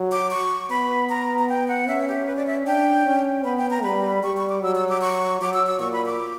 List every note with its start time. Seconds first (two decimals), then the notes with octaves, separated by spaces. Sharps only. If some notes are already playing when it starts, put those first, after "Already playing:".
Already playing: F#3
0.12 D6
0.31 C#6
0.70 B3 B5
1.09 A#5
1.39 A#5
1.49 G5
1.68 F#5
1.88 C#4 E5
2.08 G4
2.26 B4
2.36 D5
2.47 E5
2.66 D4 G5
3.06 C#4
3.45 B3 B5
3.57 G5
3.71 A#5
3.83 G3 B5
4.23 G3 C#6
4.37 C#6
4.49 D6
4.62 F#3 E6
4.75 E6
4.89 D6
5.01 C#6
5.41 F#3 D6
5.54 E6
5.67 E6
5.80 A#2 C#6
5.93 B5
6.06 D6